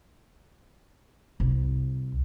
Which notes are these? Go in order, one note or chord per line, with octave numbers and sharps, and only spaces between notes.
C2